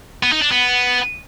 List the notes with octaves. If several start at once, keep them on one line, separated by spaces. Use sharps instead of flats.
B3
D#4
D4
B3